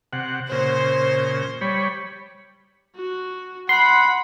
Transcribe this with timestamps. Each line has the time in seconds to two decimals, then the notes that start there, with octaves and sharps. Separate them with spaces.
0.13 C3 F#5
0.52 A#2 C#3 C5
1.61 G3 C#5 B5
2.96 F#4
3.69 F#5 B5 C6